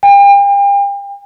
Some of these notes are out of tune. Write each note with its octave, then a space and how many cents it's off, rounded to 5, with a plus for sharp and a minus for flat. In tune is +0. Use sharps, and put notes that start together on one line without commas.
G5 +40